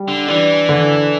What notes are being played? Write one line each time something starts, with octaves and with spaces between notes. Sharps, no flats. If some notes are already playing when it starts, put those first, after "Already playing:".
Already playing: G3
D3
E3 D4
D3